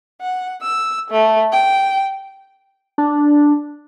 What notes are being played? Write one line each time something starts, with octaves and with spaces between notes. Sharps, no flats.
F#5
E6
A3
G5
D4